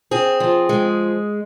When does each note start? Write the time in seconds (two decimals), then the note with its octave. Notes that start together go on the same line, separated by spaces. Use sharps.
0.11 C4 G#4
0.40 F3
0.69 G#3